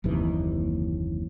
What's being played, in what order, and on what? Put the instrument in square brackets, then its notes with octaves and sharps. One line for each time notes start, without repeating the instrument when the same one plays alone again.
[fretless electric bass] F#1 D#2 C3 E3